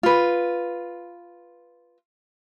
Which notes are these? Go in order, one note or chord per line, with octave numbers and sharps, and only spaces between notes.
F4 B4